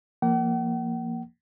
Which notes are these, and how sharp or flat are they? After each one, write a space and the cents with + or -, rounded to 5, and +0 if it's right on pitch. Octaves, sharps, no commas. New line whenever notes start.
F3 -20 A#3 +0 F#5 +45